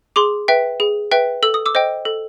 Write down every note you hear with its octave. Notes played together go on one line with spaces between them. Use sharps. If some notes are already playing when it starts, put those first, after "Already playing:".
G#4 C6 D6
B4 E5 G5
G#4
B4 E5 G5
A4 E6
D#6
D6 E6
C5 D#5 G5
A4